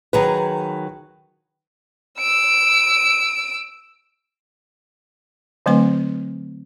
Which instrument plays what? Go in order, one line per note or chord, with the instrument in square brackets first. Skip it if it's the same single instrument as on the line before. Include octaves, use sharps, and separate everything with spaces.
[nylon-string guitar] D#3 F#3 G#4 [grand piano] B4
[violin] E6 D7
[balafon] D3 F#3 A3 C4 B4 C6